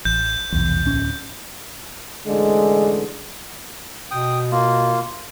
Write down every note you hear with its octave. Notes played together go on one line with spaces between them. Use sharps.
A1 G6
F1 B1 E2
D1 C#4
A1 D3 G#3
B2 G5 D#6
A#3 F4